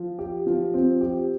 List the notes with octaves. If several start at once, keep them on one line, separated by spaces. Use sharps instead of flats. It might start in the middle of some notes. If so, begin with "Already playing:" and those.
Already playing: F3
G4
F3
C4
G4